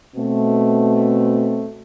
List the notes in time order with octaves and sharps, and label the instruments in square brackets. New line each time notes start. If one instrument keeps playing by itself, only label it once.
[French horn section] B2 A3 C4